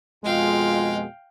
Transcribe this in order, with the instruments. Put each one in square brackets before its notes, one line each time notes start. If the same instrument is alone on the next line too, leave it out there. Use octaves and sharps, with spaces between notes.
[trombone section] F2 B2 G#3 [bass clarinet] F4 [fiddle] F5 G5